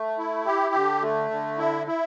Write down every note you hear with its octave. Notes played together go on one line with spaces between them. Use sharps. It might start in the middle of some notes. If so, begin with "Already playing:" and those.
Already playing: A3
E4
G4
D3
A3
D3
E4
E4